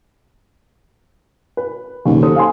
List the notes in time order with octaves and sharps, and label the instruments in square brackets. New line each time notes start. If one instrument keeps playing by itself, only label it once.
[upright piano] B4
[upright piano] F#1 [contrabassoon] D#2
[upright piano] A4 C5 D#6
F5 G#5 C6